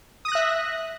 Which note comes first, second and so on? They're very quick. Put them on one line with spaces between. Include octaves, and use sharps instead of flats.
D#6 A#6 F#6 E5